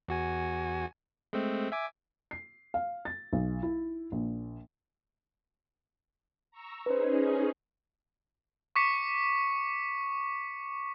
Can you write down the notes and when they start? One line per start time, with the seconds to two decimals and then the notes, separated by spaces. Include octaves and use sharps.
0.08 E2 F#4 G#5
1.33 G#3 A3 C4
1.72 E5 G#5 D6
2.31 C7
2.74 F5
3.05 A6
3.33 B1
3.63 E4
4.12 A#1
6.51 A#5 C#6 E6
6.86 C#4 D#4 G#4 B4 C5
8.76 C#6 D6 B6 C#7